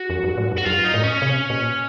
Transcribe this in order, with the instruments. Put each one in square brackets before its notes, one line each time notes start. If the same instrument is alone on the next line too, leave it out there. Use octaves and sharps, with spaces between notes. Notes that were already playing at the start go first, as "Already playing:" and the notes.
Already playing: [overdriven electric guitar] F#4
[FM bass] F2
F#2
A2
F#2
[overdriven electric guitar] F#4
[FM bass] F#2 [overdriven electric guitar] F4
[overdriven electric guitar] D#4
[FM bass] A2
[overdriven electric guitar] C#4
[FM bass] C3
A#2